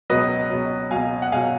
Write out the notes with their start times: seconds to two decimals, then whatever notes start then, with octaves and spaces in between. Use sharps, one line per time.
0.10 C#2 B2 F#3 B4 D#5
0.50 C#2 B2 F#3
0.91 C#2 B2 F#3 F5 G#5
1.22 F#5
1.32 C#2 B2 F#3 F5 G#5